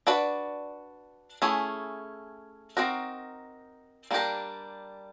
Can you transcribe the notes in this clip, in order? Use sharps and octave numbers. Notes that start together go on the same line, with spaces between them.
D4 F#4 B4 D5
A3 C#4 E4 G#4
C4 D#4 F#4 A#4
G3 A#3 D4 G4 A#4